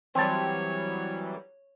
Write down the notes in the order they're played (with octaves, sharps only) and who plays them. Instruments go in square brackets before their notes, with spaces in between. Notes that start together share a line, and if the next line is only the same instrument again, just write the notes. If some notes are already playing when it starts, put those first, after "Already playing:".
[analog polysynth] E3 F#3 G3 [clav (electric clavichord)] C4 A5 [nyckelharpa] C#5